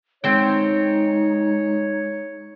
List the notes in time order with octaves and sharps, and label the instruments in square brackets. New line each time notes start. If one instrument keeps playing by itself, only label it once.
[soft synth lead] G#3 [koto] C4 G5 [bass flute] D#4 [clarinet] C#5